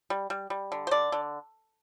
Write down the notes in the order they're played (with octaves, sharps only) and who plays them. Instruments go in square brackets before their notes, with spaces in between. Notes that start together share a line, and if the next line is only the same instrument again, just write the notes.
[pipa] G3
G3
G3
D3
C5
D3 D5
D3